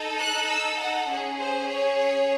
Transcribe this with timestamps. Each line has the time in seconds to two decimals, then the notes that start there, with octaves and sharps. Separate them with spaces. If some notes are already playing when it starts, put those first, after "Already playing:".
Already playing: D#4 A4
0.19 F#6
0.49 E6
0.79 F#5
1.09 C#4 G#4
1.38 C5
1.68 C#5
1.98 C#5